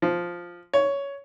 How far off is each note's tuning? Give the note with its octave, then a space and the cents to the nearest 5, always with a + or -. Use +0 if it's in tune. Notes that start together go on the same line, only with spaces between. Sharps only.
F3 +0
C#5 +10